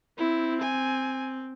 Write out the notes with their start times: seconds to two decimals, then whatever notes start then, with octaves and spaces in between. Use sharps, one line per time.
0.18 C4 E4
0.62 G#5